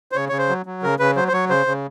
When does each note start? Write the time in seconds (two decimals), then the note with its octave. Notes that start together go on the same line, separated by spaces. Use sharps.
0.12 C5
0.16 C#3 C#5
0.29 C#3 C#5
0.38 C5
0.49 F#3
0.66 F#3
0.83 C#3 A#4
0.99 C#3 B4
1.16 F#3 C5
1.28 C5
1.33 F#3 C#5
1.50 C#3 C5
1.67 C#3